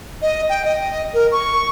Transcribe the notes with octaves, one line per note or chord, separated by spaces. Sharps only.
D#5
G5
D#5
A#4
C#6